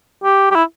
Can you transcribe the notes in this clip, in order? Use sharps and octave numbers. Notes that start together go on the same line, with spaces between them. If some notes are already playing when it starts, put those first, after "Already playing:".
G4
G4
E4